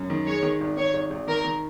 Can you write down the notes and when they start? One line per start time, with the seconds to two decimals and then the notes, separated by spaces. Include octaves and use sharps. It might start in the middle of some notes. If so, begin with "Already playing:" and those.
Already playing: F#2
0.10 D#3
0.26 G#3 C#5
0.43 D#3
0.61 G#1
0.76 D#3 C#5
0.94 G#1
1.11 G#1
1.27 D#3 A#4
1.44 D#3